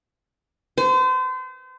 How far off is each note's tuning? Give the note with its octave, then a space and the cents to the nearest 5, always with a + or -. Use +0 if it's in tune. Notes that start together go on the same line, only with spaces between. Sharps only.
C5 -35